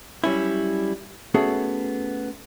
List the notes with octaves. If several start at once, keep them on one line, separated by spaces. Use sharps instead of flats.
F#3 G3 C#4 E4
A3 B3 C#4 F#4 G#4 A4